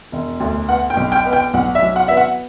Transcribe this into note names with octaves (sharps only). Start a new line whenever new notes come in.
E1
D2
B3 F#5
G5
B1
G5
B3
G5
B1 F#5
E5
F#3
F#5
B3 E5
F#5